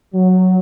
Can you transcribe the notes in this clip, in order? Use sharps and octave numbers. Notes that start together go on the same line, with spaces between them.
F#3